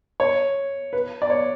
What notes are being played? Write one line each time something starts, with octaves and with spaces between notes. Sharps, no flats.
C#5
B4
D5
C#5